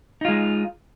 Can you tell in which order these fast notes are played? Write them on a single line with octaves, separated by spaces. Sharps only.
D#4 F4 G#3